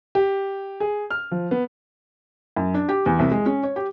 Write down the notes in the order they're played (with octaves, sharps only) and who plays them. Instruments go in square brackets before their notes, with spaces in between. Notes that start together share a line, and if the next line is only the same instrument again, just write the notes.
[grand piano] G4
G#4
F6
F3
B3
[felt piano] F#2
D4
G4
E2
C2
G#3
C#4
C#5
G4